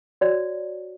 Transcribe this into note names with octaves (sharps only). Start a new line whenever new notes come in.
F#4 C#5 D5